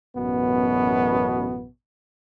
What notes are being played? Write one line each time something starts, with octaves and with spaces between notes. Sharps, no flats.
A1 F#2 B2 B3